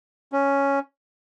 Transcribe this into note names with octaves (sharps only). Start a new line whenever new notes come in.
C#4